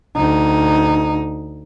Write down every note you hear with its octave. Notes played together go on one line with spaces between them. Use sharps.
D2 D#4